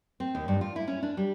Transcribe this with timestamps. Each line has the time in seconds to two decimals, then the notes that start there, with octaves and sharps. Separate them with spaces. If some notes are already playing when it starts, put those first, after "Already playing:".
0.20 C4
0.35 D#2
0.48 G2
0.61 F4
0.76 E4
0.87 C#4
1.03 D4
1.17 G3